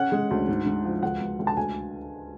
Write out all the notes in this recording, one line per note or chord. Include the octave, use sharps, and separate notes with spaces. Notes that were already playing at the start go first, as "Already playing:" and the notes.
Already playing: C#4 F#5
G#3
D2
G#2
G#2
F3
C#2 F#5
C#2
C#2
A5
D2 G#5